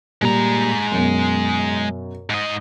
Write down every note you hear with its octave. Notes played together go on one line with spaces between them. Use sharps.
A#2 G3 G#3 A#5
F#2 B2
G#2 D#5